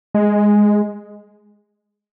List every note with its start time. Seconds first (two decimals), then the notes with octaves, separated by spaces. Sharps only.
0.15 G#3